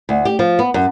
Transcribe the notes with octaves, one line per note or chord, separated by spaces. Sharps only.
D2
G4
F3
B3
F#2